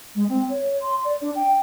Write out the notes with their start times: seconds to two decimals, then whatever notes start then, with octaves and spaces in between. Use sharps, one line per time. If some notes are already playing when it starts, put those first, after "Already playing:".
0.15 G#3
0.29 C4
0.49 C#5
0.82 C6
1.04 D5
1.21 D4
1.35 G5